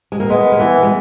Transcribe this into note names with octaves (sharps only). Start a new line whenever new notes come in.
G#3
A#3
G#3 B3
A#3
E3 B3
G#3